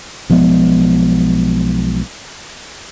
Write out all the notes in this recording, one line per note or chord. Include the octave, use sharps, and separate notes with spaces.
B1 F3 G#3 B3